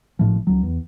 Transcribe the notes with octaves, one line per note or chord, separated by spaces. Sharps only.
G#1 A2 F3
C#2 F#3
E2